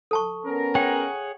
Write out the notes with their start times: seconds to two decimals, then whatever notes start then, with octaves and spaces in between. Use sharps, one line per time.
0.11 A4 A5 C#6
0.45 B3 C#4 A#4
0.75 G#4 C#5 F#5 G5